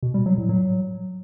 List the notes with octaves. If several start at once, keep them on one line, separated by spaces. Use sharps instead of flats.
B2
G3
F#3
A2
F#3